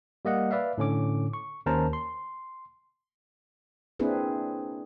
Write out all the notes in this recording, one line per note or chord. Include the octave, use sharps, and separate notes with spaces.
G3 A#3 D#5 F#5
B4 D5 E5 F5
A2 D3 C#4 D6
C#6
D#2 C#4 A#4 C5 A5 A#5
C6
A#3 C4 D4 E4 G#4 B4